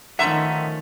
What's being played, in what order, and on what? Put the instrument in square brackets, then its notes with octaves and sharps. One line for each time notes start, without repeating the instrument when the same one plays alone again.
[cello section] D#3 [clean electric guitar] F3 A3 C#4 [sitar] E5 [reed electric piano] F#5 A#5 C6